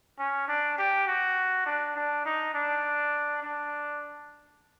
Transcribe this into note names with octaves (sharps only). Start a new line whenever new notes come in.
C#4
D4
G4
F#4
D4
D4
D#4
D4
D4